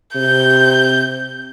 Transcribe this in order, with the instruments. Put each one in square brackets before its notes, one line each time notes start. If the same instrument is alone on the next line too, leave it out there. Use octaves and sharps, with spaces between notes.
[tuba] C3 [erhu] G6